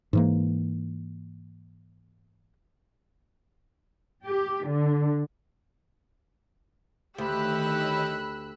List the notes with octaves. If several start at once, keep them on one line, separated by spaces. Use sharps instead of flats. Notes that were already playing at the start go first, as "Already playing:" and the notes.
G#2 E3 A#3
G4
D3
D2 D#3 G4 C#5 D#5 B5 E6 F#6